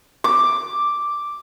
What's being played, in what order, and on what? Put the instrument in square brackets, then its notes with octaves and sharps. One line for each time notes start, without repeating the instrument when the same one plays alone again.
[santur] D6